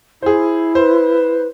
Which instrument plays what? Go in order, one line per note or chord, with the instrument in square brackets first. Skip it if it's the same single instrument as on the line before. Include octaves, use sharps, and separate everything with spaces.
[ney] E4 [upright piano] G#4 C5
[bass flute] B4 [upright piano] C5